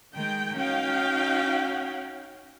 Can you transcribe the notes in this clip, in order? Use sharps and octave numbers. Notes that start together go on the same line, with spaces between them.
D#3 G#3 G5
C#4 D#4 F#4 F5 G5